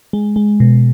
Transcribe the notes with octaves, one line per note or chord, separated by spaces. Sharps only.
G#3
G#3
B2